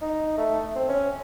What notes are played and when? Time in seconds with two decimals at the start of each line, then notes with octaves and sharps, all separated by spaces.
0.02 D#4
0.38 A3
0.75 C4
0.89 C#4